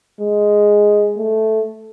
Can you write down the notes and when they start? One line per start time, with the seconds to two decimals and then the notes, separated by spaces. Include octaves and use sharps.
0.20 G#3
1.17 A3